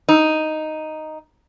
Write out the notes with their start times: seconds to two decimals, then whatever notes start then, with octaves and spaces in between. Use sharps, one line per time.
0.09 D#4